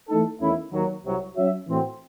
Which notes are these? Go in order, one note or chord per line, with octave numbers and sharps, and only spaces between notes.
E3 A3 D#4 A4
E2 D#3 A3 C#4 E4
D#2 D#3 F#3
C2 C3 F#3
F#3 C#4 F#4 C#5 E5
A2 E3 C4 F#4